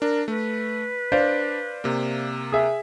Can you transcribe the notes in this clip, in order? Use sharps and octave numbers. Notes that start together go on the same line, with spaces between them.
D4 A#4
A3 B4
D4 C5 D5 F5
C3 A#3
G#4 E5